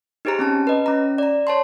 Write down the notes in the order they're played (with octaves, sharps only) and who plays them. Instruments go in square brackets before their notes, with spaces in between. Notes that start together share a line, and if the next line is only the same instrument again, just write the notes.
[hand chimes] D#4 G4 G#4 C5 A#5
C4 C#4 A5
B4 D#5
C#4 A#5
D5 A#5
C#5 A5 C6